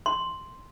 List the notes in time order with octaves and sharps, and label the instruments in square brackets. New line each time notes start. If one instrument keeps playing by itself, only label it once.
[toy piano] C6